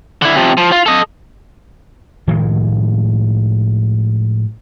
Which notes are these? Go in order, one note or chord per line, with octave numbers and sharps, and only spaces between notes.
D3 E4
C3 F3
F3
F4
A4 D#5
A2 D#3 F3 G#3